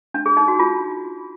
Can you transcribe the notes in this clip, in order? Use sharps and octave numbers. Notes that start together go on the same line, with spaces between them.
D4
G#4
D#4
F#4
F4